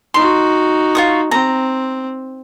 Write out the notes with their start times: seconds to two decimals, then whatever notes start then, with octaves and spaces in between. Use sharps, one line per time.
0.14 D#4 F#4 C6
0.95 F4 C#6 D#6
1.31 C4 A#5